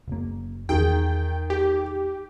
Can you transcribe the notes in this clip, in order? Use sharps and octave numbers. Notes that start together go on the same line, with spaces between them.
F#1 A#3
E2 D#3 G#4 G5
G4